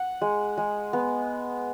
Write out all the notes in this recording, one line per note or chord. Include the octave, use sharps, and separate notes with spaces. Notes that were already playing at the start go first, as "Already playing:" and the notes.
Already playing: F#5
G#3
G#3
B3